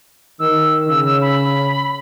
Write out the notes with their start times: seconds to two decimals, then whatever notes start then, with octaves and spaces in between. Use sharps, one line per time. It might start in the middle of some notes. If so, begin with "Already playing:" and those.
0.39 D#3 E6
0.89 C#3 E6
1.05 E6
1.21 B5